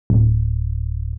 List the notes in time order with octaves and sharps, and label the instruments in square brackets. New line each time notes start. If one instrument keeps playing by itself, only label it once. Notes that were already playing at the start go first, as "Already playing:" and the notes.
[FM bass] D1